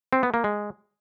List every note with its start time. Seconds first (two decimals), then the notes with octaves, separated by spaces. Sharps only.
0.13 C4
0.23 B3
0.34 A#3
0.44 G#3